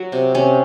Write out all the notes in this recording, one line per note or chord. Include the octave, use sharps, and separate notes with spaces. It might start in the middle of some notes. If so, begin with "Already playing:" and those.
Already playing: F#3 F#4
C3
C3 C#4